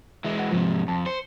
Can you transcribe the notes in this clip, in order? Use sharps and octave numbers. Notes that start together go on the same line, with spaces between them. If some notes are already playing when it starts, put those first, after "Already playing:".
E3 G#3 E5
F#5
G#2 C3 F3
F2 A5
C5 C#7